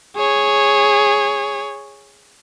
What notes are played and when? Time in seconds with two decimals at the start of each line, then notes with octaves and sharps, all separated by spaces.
0.16 G#4 C#5